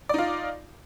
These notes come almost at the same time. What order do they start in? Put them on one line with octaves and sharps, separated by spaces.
D5 D#4 F4